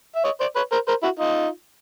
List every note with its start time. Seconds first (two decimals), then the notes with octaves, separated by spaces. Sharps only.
0.16 E5
0.24 C#5 D#5
0.40 C5 D5
0.56 B4 C#5
0.72 A#4 C5
0.88 A#4 C5
1.03 E4 F#4
1.19 D#4 F4